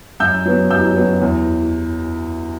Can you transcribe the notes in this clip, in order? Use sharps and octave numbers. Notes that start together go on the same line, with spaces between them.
F#2 E6 G6
F#3 B3
F#2 E6 G6
F#3 B3
E2